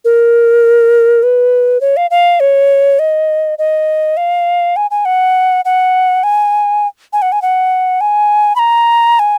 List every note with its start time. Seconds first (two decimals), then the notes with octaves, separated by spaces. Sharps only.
0.05 A#4
1.23 B4
1.81 C#5
1.97 F5
2.11 F5
2.40 C#5
2.99 D#5
3.58 D#5
4.17 F5
4.76 G#5
4.91 G#5
5.05 F#5
5.65 F#5
6.23 G#5
7.13 G#5
7.22 F#5
7.32 G#5
7.42 F#5
8.01 G#5
8.56 B5
8.59 A#5
9.19 G#5